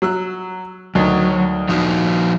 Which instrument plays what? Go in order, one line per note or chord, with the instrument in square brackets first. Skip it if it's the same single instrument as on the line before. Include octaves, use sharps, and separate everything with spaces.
[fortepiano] F#3 E6 F#6
[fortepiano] D2 D#3 [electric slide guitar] F#3
[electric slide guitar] F3 D#4 F#4